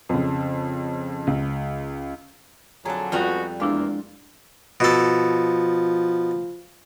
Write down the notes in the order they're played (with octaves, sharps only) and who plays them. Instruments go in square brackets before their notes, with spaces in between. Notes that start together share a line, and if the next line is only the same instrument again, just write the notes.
[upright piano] F2 C#3
C#2
[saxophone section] F2 D3 F#3 [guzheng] G#4 A5 [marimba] A#5
[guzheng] F2 G3 A#5 [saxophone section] G#3 B3 F#4 [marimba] F4
[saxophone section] E2 A#3 [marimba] G#3 D4 E4 [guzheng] F4
[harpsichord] B2 A4 [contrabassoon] F3